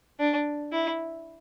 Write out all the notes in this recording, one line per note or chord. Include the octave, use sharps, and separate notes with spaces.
D4
E4